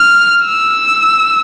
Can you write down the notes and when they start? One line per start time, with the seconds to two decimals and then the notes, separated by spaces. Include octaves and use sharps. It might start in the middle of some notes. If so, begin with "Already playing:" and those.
Already playing: F6
0.46 E6